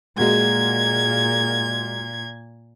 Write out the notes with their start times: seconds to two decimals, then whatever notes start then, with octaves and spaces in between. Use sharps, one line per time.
0.18 A#2 G#3 A#3 F#4 G#6